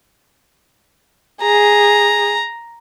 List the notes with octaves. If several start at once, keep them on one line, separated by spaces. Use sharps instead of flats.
G#4 A#5